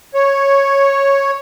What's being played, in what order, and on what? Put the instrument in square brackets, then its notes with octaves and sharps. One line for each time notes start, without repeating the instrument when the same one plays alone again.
[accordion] C#5